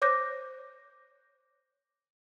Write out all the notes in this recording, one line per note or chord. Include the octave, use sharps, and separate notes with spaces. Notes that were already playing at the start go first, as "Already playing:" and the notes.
C5 C#5 D6 F#6 G6 A#6